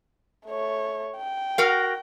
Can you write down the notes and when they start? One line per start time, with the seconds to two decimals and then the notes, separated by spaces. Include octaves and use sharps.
0.46 A3 C#5
1.17 G5
1.58 F#4 A#4 F5